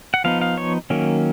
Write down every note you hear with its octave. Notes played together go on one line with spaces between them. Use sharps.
F#5
F3 B3 D#4 F5
F5
C#5
D#3 F#3 A#3 C#4